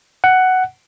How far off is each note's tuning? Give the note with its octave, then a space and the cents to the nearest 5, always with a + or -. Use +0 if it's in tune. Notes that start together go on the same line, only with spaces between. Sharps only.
F#5 +10